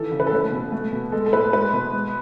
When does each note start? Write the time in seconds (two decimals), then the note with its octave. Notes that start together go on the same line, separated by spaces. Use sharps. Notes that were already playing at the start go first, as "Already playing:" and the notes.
Already playing: D#3 E3 A4
0.12 C#3
0.20 B4
0.27 A4
0.32 A3 B4
0.52 B2
0.72 A3
0.92 B2
1.12 G#3 A4
1.26 A4
1.33 A2 B4
1.53 G#3 B4
1.73 B2
1.93 G#3